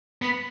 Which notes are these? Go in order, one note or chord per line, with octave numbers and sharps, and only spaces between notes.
B3